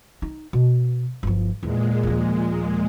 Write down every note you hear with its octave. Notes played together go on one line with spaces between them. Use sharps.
D#4
B2
G1 F3
E2 A#2 G#3
D#2 F3